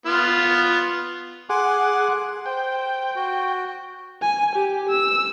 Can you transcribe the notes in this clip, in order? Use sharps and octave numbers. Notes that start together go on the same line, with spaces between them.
B3 F4
G#4 F#5 G#5 C6 D6
C5 G5
F#4
G#5
G4
E6